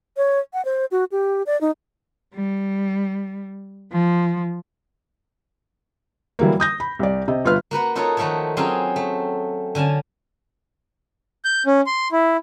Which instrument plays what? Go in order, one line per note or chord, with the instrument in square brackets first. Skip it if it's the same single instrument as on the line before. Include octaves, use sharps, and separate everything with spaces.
[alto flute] C#5
F#5
C5
F#4
G4
D5
D#4
[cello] G3
F3
[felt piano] E3 F#3 G3 A#3
D#6 G6 A#6
B5
C2 D5
C3 D#5
G1 F4 B4 F6
[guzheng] A#3 F#4 B4 F#5
D#4 F4 F#4 A4 C#5
D#3 F3 A3 F#4 A#4 C#5
F#3 C4 C#4 F4 G#4 F5
A3
D3 C#4 G#5 A5
[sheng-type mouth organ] G6
C#4
C6
E4